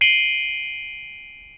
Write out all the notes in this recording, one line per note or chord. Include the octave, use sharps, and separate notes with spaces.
C7 D7 D#7 F#7 G7